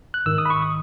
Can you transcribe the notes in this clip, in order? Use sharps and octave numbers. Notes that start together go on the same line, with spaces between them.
F#6
G#2 D#3 E6
D#6
B5
C#6
D#6